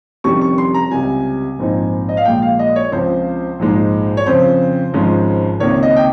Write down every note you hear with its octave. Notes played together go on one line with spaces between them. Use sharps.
F1 F2 D#3 G3 C#4 C#6
C#6
C6
A#5
C#2 C3 G3 G#5
A#1 G#2 F3 C4 D#4
D#5
F5
A#1 A#2 G#3 G5
F5
D#5
C#5
C#2 C#3 F3 C4 C5
A#1 G#2 F3 G#3 D#4
C#5
F2 C#3 F3 C5
G#1 G#2 F3 G#3 C#4
C#2 C3 D#3 A#3 C#5
D#5
G5